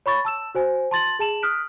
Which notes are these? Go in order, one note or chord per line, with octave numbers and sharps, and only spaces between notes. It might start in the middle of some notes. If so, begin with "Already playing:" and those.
C#5 B5 C#6 A6
A5 E6 E7
F#4 C5 G#5
A5 C6 A6 F#7
G#4 A5 E7 F#7
D#6 F6 F#6 B6 D7